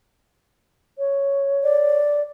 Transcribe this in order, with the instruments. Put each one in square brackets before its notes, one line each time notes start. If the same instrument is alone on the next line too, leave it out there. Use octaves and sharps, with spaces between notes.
[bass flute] C#5
[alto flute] D5